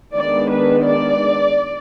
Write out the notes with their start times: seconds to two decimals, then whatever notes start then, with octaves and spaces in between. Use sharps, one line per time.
0.13 D#3 G#3 B3 D4 D5
0.50 B4
0.85 D5